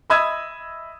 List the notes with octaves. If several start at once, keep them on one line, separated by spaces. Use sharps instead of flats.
D#5 E5 B5 D#6 E6 G#6